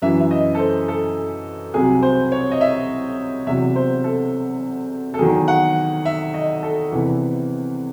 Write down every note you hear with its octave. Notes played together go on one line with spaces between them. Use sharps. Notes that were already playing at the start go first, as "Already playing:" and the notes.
F#2 E3 E5
E5
D#5
A4
C5
A4
C2 C3 F#3 G#4
C5
C#5
D#5
E5
E2 C3 F#3 E5
C5
A4
A4
E2 D#3 F#3 G#4
F#5
E5
D#5
A4
E2 C3 E3